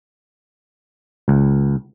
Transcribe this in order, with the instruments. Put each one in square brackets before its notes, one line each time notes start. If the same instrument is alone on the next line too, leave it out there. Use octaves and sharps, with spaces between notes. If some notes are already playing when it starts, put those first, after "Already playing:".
[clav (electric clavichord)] C#2